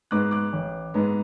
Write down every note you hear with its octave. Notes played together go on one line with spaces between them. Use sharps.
G#2 G#3 B3 D6 F#6
D6 F#6
A1
G#2 G#3 B3